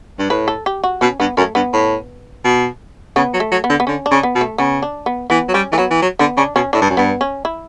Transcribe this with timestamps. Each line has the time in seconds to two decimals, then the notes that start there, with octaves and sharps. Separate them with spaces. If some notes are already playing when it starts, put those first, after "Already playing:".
0.19 G2
0.30 A2 B4
0.48 A4
0.66 G4
0.84 F#4
1.01 B2 C#4
1.20 G2 B3
1.37 F#2 A3
1.55 G2 B3
1.73 A2
2.44 B2
3.16 C#3 B3
3.34 F#3
3.40 A3
3.52 F#3
3.64 B3
3.70 D3
3.80 B3
3.87 D3 C#4
4.06 D4
4.11 C#3
4.23 B3
4.35 B2
4.41 A3
4.58 C#3 B3
4.83 D4
5.06 B3
5.30 E3 B3
5.48 F#3
5.54 G3 C#4
5.72 E3 A3
5.78 F#3 B3
5.90 E3
6.02 F#3
6.19 D3 B3
6.37 C#3 D4
6.55 B2 C#4
6.73 A2 D4
6.82 G2
6.90 F#2
6.97 G2 B3
7.21 C#4
7.45 E4